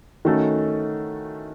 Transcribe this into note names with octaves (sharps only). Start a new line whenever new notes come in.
D#3 A3 C#4 F#4 A4